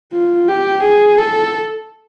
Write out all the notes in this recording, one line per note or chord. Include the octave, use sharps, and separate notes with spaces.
F4
G4
G#4
A4